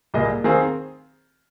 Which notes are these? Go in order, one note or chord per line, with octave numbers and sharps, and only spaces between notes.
C2 A#2 A#3 G#4 D#5
D#3 C4 G#4 C5 F5